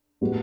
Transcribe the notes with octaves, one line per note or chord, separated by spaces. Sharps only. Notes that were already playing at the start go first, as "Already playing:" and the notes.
A2 G3 B3 F#4